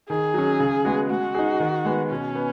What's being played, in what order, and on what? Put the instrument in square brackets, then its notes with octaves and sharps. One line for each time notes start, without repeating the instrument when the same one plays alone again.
[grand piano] D#3 [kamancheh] G#4
[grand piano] F#3 C#4
C#3
G#3 B3 F#4
[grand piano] G#3 [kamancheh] F#4
[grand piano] D#4 G#4
D#3
G#3 B3
[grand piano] B2 [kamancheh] C#4
[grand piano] B3